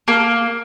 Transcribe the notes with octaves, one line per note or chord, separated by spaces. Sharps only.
A#3